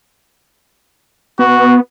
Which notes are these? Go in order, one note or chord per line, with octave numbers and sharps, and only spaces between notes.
B3 F#4